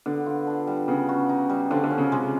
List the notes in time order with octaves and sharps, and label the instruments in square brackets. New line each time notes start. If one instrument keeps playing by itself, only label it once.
[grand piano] D3 [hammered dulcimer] B3
[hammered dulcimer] F4
D4
G3
[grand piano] C#3 [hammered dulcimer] B3
[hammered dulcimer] F#4
D#4
G3
[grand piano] D3 [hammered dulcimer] F3
[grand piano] D3
[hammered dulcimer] C#4
[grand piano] C#3
[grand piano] C3 [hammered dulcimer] G#3